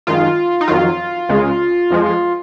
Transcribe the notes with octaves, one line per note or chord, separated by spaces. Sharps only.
F#2 D#3 G#3 F4
D#4
F2 D#3 F#3 F4
C#2 C#3 G#3
F2 F3 G#3